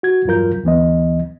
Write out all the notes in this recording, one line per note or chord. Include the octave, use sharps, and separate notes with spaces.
F#4 G#6
E2 G2 F#3 F4 A#4 G6
D2 E3 B3 D#5